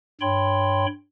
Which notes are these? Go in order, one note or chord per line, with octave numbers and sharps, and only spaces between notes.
G2 C#5 G5 B5 C6